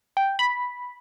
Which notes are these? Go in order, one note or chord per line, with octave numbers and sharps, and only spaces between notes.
G5
B5